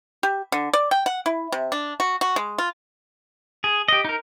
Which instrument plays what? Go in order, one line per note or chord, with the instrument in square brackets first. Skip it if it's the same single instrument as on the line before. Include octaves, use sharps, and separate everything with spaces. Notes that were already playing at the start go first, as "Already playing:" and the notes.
[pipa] G4
D3
D5
G5
F#5
E4
C3
D4
F#4
F#4
G#3
F4
[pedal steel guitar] G#4
G4 D#5
D#4 A#4